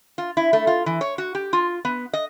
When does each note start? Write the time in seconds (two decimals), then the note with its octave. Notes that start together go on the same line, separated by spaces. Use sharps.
0.18 F4
0.37 E4
0.53 A3
0.67 F4
0.86 E3
1.01 C#5
1.18 F#4
1.35 G4
1.53 F4
1.85 B3
2.13 D#5